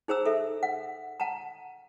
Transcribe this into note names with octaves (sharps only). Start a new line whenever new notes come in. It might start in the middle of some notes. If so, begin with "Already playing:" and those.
D#4 G#4 C5 A#5 E6
A4 E5
F#5
F#5 A5 A#5